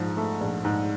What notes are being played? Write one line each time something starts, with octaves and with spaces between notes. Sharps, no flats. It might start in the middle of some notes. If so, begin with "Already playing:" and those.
Already playing: A#1 G#2 F3
A3
A#1
G#2